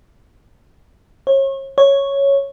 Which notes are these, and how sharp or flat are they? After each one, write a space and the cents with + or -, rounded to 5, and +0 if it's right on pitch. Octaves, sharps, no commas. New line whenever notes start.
C#5 -35
C#5 +0